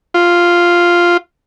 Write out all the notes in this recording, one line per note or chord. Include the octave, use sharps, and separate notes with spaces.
F4